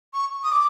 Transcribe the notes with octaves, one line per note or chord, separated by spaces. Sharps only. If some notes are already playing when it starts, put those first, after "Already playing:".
C#6
D#6
D6